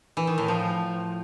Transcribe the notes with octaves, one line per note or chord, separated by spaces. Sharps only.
E3
D#3
A2
F3